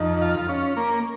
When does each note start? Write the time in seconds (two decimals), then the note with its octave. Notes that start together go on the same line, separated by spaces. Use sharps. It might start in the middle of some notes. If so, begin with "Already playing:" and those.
Already playing: F2 D#4
0.22 F4
0.49 C#4
0.77 A#3